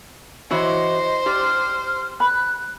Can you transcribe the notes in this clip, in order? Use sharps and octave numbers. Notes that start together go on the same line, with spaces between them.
E3 E4 F#4 C5 C#5 D#5
G4 D5 F6
B5 F#6